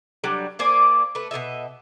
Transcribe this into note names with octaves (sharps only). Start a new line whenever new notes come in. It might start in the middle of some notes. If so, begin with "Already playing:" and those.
F#3 G3 D4
A#3 C5 D5 G#5
A3 B4
B2 F3 D#5 E5